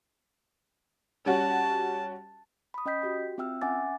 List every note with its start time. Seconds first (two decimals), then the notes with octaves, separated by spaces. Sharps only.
1.26 G3 C#4 F#4 A5
2.74 B5 D#6
2.86 C#4 D#5 G5 G6 B6
3.02 F#4 G4 G5
3.38 C4 F4 E5 G5 E6 F6
3.62 C#4 E5 F#5 G#5 D6 A6